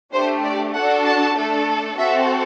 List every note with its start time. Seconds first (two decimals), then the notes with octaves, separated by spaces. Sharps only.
0.13 A3 D4 G4 C5
0.45 D5
0.75 D4 F#4 A4 F#5
1.06 A5
1.36 A3 D4 A4
1.98 C4 F#4 A4 E5